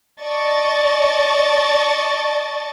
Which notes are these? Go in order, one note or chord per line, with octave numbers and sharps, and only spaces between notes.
D5 D#5 A5 C#6 A6